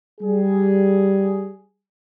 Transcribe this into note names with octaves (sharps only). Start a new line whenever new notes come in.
G3 G#4